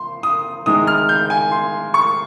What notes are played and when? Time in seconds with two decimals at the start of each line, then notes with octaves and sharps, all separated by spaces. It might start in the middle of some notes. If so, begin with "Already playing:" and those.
Already playing: C6
0.23 D#6
0.66 C3 D#3 G#3 D#6
0.87 F6
1.09 G6
1.30 G#5
1.51 C6
1.94 C#6